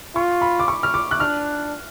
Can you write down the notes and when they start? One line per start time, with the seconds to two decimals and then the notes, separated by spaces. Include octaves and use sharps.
0.16 F4 C#6
0.42 B5
0.60 D6
0.68 C#6
0.83 F6
0.94 D6
1.11 F#6
1.20 D4 F6